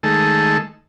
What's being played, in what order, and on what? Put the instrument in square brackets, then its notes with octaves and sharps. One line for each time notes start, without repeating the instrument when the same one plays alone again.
[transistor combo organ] D#3 G#3 A3 A4